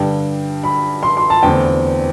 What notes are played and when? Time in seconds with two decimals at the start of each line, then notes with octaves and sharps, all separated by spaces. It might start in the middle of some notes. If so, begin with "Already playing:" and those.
Already playing: G2 D3 G3 G5
0.64 B5
1.03 C6
1.17 C6
1.30 A5
1.43 E2 D3 A3 C4 G5